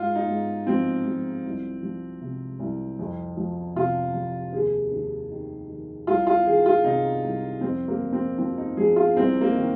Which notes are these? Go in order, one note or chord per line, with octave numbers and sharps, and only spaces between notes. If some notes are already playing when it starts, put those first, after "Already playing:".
Already playing: G#2 F4
D#4
G#2
F3 C4
F3
C2
F3
C3
C2
F2
F3
C3 F4
F2
D#2 G#4
D#2
D#3
D#3
C2 F4
F4
D#3 G#4
F4
C3 D#4
C2
F2 C4
A#3
F2
C4
F3 C4
D#4
F3 G#4
F4
C2 C4
A#3
D#3